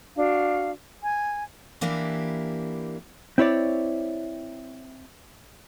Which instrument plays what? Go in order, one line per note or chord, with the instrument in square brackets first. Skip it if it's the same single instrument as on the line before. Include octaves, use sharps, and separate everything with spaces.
[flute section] D4 F#4 F5
G#5
[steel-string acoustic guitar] E3 A#3 D4 E4 G4
[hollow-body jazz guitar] C4 E4 C#5 D5